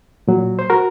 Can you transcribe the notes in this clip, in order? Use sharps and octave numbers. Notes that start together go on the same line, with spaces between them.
A#2 F#3
C5
F#4 A#4